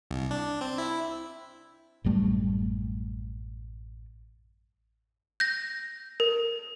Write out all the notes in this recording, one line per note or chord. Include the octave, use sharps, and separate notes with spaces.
C2
D4
C4
E4
A1 F#2 G3 A3
G6 A#6
A#4